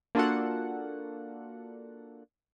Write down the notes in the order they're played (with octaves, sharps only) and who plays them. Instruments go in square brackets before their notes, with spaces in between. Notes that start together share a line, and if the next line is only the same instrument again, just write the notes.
[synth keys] A#3 D4 F4 F#4 A4 F#5